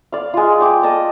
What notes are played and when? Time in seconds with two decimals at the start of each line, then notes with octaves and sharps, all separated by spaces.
0.12 D5 F5
0.34 G#3 F4
0.61 G5 D6
0.83 D5 D#5 A5 D#6